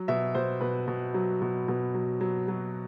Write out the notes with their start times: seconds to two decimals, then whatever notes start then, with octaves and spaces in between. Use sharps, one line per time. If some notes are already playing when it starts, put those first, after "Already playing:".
Already playing: F#3
0.08 B2 E5
0.35 B2 C5
0.61 B2 B4
0.88 B2
1.14 F#3
1.42 B2
1.68 B2
1.94 F#3
2.21 F#3
2.48 F#3